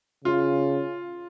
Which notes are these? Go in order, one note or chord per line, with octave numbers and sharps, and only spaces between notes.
C#3 F4